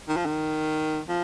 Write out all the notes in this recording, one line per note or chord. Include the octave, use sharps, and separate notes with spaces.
D#3
F3
D#3
F3